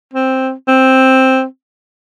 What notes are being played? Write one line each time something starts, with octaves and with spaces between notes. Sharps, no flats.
C4
C4